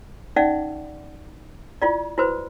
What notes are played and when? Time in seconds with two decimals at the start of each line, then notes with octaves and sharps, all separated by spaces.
0.36 C#4 D#4 D5 E5 F#5
1.82 E4 F4 D5
2.18 E4 F#4 B4 C5